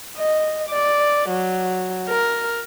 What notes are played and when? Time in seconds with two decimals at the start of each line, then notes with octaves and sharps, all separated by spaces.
0.17 D#5
0.69 D5
1.30 F#3
2.09 A#4